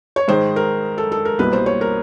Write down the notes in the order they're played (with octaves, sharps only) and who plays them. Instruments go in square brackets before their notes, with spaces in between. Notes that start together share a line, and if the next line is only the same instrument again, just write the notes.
[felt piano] C#5
G#2 D#3 G#3 C5
A#4
A4
A4
A#4
C2 B2 G3 A#3 B4
C5
C#5
A#4